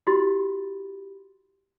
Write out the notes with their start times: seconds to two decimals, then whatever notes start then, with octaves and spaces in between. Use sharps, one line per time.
0.07 E4 F#4 G4 B5 C6 A6